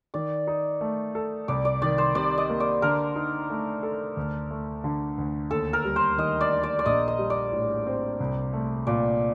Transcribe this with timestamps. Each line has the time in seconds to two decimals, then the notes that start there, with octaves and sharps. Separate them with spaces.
0.14 D#3 D5
0.47 D#4
0.81 A3
1.15 A4
1.48 C2 D5
1.65 D5
1.82 D#3 D5
1.98 C5
2.15 C3 D5
2.38 D#5
2.50 A#3
2.60 D5
2.82 D3 A#4
3.16 D#4
3.50 A3
3.83 A4
4.17 D2
4.51 A3
4.84 D3
5.18 D2
5.51 D#2 A4
5.73 A#4
5.85 G3
5.96 C5
6.18 D#3 D#5
6.41 D5
6.51 D4
6.63 D5
6.79 D5
6.86 A#1 D#5
7.08 D#5
7.18 G3
7.30 D5
7.52 A2
7.87 C4
8.20 C2
8.53 A3
8.87 A#2 D5